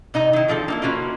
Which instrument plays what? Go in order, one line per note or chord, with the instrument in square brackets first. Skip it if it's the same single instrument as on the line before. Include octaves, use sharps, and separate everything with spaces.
[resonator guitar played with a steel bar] C3 D#4 D#5 A#5
D#3 E4
D3 F3 C4 A4
A#3 D#4 E4
A#3 C#4 F4 F#4 B4